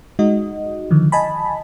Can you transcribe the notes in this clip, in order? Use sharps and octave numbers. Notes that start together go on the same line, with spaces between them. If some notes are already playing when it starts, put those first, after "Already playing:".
G#3 D#4 F#4 D#5
D3 D#3 F3
D#5 G#5 A5 B5